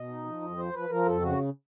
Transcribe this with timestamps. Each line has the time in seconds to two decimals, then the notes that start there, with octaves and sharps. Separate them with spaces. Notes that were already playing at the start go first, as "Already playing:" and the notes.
Already playing: B2 D#5
0.09 D#4
0.25 F3
0.42 F2
0.57 F3 C5
0.73 F3 B4
0.90 F3 A#4
1.06 F2 A4
1.22 C#3 F#4